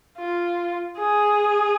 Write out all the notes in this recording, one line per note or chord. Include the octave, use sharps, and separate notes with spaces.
F4
G#4